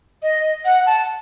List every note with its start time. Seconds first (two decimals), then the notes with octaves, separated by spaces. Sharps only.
0.22 D#5
0.65 F#5
0.86 A5